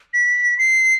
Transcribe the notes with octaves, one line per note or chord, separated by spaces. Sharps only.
B6
C7